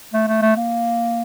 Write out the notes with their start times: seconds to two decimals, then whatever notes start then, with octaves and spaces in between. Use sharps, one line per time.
0.14 A3
0.28 A3
0.42 A3
0.56 A#3